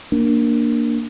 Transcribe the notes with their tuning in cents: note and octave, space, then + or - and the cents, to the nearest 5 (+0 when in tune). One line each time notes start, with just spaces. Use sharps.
A#3 +0 D4 +0